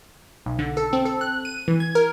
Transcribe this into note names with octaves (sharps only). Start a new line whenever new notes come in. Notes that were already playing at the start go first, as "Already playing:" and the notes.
B1
D3
A4
C4
A4
F#6
D#7
E3
G#6
A#4